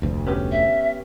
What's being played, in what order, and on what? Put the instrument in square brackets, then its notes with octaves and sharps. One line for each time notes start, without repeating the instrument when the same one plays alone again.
[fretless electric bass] F1 D2
[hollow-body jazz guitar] B3 C#4 G4
[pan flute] E5